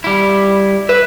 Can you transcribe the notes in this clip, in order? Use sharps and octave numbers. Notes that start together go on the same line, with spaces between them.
G3 E4
B4 E5